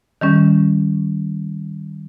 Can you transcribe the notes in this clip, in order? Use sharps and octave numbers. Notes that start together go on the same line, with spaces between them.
D#3 G3 C#4